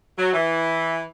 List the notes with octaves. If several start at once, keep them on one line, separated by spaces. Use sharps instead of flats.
F#3
E3